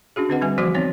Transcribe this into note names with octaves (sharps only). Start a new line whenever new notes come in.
C#4 D4 F#4 G#4
D3 C4 D4 B4 D#5 F#5
D3 G3 G#5
E3 F3 A3 F#4 C5 D6
B3 C4 D#4 C#5